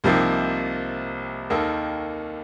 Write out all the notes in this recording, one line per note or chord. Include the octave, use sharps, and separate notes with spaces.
C2 C3 F3 A#3 D#4
D#2 D#3 A#3 D#4 A4